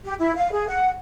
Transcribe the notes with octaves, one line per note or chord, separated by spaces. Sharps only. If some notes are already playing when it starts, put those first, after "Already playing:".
G4
E4
F5
G#4
F#5